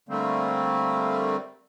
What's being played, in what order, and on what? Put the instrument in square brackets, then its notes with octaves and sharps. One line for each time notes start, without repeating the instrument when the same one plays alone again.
[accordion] D3 G3 A3 A#3 C4